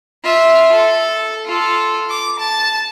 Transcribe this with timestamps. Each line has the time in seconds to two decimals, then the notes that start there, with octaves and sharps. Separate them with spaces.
0.24 F4 E5
0.72 A4
1.45 F4 A4
2.09 D6
2.39 A5